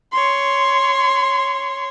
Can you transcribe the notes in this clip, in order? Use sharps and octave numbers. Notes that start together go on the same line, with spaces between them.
C#5 C6